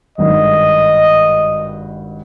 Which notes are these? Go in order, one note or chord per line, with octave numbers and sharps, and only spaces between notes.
G#1 G2 D#3 D#5